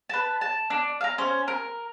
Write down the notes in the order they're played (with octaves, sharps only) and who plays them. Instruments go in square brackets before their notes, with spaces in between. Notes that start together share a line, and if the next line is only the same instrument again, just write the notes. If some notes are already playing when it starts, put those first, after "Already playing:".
[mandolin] B4 A5
A5
D4
F5 A#5
C#4 C5
A#4